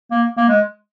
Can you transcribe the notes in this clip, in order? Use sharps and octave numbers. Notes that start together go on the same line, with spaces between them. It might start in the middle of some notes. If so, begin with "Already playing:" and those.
A#3
A#3
G#3